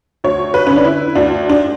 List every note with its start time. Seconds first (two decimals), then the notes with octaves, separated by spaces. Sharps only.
0.24 D2 C#5
0.54 B4
0.67 D3 C#4
0.76 D4
0.85 E4
1.15 D2 D4
1.50 D4